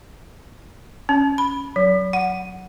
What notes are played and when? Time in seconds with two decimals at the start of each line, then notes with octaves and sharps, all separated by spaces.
1.09 C#4
1.38 B5
1.76 F#3
2.13 F#5